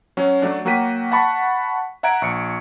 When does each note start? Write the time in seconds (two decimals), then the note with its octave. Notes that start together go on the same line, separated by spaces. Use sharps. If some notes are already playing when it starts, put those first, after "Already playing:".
0.17 F#3 C#4
0.42 F#3 A3 D4
0.65 F#3 A#3 F#4 G5 B6 D#7
1.12 F#5 A5 B5 C#6
2.03 E5 F#5 A#5 G#6 D7
2.22 A#1 C#6 C#7